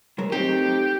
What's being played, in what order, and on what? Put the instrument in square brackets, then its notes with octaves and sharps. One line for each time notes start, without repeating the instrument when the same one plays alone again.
[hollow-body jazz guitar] F#3 G#3 A#4
[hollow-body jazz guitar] A3 C4 D#4 [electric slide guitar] G4